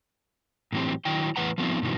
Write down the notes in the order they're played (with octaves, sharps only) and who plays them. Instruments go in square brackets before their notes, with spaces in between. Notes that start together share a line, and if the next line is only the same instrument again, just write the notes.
[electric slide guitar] A2 E3 F#3 C4 G4
D#3 F#3 E4 G5
A2 E3 B4 F#5 A#5
F3 A3 B3 C4 D#4 F4
G2 B2 D#3 E3 F#3